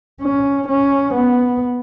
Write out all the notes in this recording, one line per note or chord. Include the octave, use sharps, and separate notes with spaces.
C#4
C#4
B3